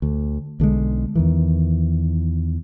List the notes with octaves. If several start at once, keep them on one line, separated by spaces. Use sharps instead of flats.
D2
B1 D3 F3 G#3
E2 D#3 E3